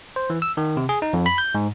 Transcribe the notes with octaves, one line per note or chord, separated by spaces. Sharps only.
C5
E3
E6
D#3
C3
G#4
D#4
F2
B5
G6
G#2